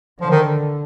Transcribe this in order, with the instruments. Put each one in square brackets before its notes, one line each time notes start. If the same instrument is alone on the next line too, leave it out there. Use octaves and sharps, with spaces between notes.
[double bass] D3 [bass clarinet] F3
[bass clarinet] D#3